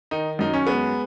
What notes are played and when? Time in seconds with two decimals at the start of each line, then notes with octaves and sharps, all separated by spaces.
0.11 D#3 D#4
0.39 F#2 D#4
0.54 C#4
0.67 G#3 B3